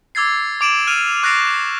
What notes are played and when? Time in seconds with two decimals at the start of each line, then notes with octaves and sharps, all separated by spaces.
0.15 D6 E6 G#6 A6 C7
0.61 D6 D7 E7 F#7
0.87 F6 D#7 F7
1.23 C#6 F#6 A6 A#6 C7 D7